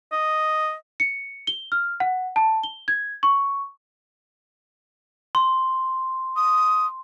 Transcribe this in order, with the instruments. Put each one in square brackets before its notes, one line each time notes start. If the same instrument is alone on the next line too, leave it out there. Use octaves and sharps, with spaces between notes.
[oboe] D#5
[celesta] C#7
G7
F6
F#5
A5
G7
G#6
C#6
[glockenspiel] C6
[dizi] D#6